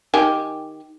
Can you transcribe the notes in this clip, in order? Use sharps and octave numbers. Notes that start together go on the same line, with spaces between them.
D#3 G4 G#5